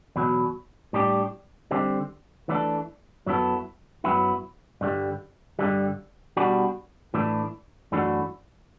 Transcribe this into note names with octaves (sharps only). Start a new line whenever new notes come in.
E2 B2 F#3
A2 G3 D4 G4
D3 G3 C4
E3 A3 D4 A4
F#2 F#3 B3 E4 A4
F#2 F#3 B3 E4
G2 D3 G3
G2 D3 G3
B2 G3 D4 F#4
A2 E3 A3 D4
F#2 E3 A3 D4 F#4